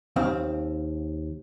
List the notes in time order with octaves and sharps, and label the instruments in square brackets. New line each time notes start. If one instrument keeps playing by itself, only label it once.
[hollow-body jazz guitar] D#2 C4 F5